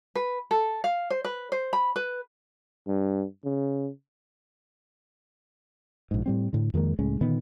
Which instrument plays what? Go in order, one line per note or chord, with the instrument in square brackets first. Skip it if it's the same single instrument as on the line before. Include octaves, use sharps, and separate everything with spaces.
[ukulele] B4
A4
F5
C5
B4
C5
B5
B4
[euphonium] G2
C#3
[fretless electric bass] A#1 G#2
A2 G3 C4
A2 D3
F2 D#3 G#3 A#3
C#2 A2 G#3 C#4
A#2 D3 D#3 B3